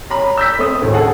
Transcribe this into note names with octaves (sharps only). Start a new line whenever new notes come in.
C#5 A#5 B5
E6 G6 B6
A3 C4 D#6
D2 A2 D#3
G#4 A4 F#5 G#5 A5